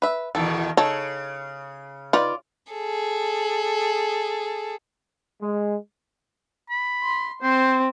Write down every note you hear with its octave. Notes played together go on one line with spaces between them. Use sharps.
B4 E5
E2 B2 D#3 A4
C#3 D#4 A4 C#5
D#4 F4 B4 D5
G#4 A4
G#3
B5
C6
C4 C5